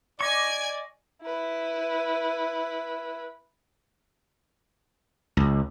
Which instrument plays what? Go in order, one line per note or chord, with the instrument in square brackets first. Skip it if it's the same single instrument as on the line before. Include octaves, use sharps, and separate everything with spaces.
[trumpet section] D5 [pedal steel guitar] D#5 C#6 [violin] G#5 G#6
[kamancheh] E4 B4
[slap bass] C#2